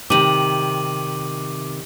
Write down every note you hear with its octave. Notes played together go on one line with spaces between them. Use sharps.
C3 D#3 D6 D#7 F#7